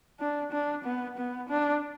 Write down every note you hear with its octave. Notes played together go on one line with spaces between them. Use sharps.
D4
D4
B3
B3
D4